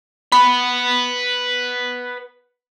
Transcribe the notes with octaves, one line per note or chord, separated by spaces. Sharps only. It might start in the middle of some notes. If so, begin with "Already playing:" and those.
B4 F#5 B5